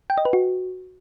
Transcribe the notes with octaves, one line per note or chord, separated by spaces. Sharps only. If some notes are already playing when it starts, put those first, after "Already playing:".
G5
D#5
B4
F#4